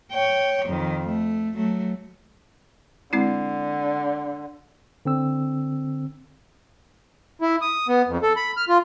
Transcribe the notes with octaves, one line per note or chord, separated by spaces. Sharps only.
C#5 G5
F2 D#3
A3
F#3 A3
D3 G#3 C4 E4
D3 C4 E6
E4
D#6
B3
F2
A4
B5
F6
F4